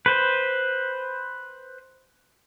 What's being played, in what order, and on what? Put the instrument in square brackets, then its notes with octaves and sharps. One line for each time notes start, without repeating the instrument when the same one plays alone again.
[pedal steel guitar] B4 C5